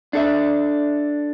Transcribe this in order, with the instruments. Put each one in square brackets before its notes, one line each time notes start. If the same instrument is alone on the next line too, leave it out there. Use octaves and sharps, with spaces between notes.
[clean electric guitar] D4 A4 E5